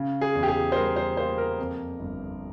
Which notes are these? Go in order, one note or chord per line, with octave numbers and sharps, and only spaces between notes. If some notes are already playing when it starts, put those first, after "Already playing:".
Already playing: C#3
G#4
E2
G4
G#4
C5
G3 A#4
C5
A#3 C5
A#4
F2
G1